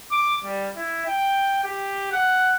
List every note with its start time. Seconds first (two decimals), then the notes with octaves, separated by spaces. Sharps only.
0.11 D6
0.44 G3
0.76 E4
1.06 G5
1.64 G4
2.11 F#5